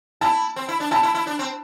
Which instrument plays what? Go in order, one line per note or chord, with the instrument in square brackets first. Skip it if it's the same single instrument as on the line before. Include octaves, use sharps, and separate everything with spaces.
[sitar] E4 [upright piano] A5
[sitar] C4
E4
D4
[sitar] E4 [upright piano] A5
[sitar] E4
E4
D4
C4